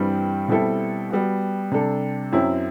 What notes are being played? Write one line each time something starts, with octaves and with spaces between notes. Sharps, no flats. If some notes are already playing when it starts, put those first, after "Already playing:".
Already playing: G2 E3 G3 C4
B2 G3 C4 E4 A4
G3 B3 F#4
C3 G3 D4 A4
F#2 F#3 C4 E4